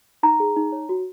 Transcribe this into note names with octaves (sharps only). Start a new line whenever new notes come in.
D#4 A#5
G#4
D#4
C#5
F#4